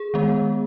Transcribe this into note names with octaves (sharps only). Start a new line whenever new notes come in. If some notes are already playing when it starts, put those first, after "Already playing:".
Already playing: G#4
D#3 G#3 B3